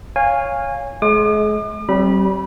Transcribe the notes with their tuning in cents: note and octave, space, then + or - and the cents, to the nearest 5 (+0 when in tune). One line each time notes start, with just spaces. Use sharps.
C#5 +0 F5 +0 G#5 -20
G#3 +35 D6 +45
G3 -35 C4 +25 B5 -20